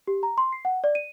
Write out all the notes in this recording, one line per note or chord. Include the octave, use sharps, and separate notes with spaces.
G4
A#5
C6
C7
F#5
D5
D#7